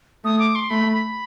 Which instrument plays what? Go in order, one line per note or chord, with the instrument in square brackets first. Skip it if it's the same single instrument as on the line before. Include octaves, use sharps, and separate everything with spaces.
[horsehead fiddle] A3 [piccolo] D#6
[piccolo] D6
C6
[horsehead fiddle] A3 [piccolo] B5
[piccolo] B5